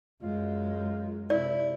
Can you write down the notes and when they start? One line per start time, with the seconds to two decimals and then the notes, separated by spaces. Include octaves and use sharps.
0.23 F#2 G#3 F4
1.30 C3 E4 D5